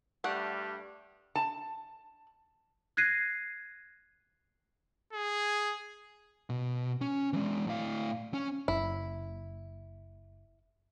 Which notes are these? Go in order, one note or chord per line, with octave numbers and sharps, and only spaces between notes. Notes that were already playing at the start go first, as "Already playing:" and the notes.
G2 G3 A3 F#5
A5
F#6 G#6 A#6 C7 D#7
G#4
B2
C#4
E3 G#3
A2 F5
C#4
F#1 E4